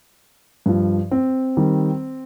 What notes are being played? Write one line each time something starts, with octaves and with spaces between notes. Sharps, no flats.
G2 F3
C4
D#3 G3